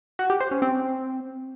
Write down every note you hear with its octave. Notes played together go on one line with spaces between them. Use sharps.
F#4
G4
C5
C#4
C4